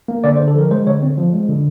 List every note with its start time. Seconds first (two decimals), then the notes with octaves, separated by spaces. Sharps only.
0.08 A#3
0.24 D3 D5
0.36 C5
0.40 D3
0.48 A4
0.55 F3 A#4
0.70 G#3 C5
0.87 D3 C#5
1.02 C4
1.18 F3
1.33 G#3
1.49 D3